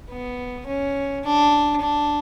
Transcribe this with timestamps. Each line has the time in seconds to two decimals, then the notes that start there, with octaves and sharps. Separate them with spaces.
0.10 B3
0.67 C#4
1.24 D4
1.81 D4